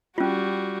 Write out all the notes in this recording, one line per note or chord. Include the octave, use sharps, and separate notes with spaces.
G3 C#4 F4 F#4